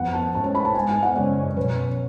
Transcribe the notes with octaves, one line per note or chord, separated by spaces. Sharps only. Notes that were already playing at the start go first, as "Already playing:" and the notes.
Already playing: F2 F3 B3 F#5
A5
A2 G#3 C#4 A5
A5
B5
A5
G#2 G#3 B3 G#5
G#5
F#5
F#2 C#3 G#3 C#4 D5
B2 F#3 C#4 B4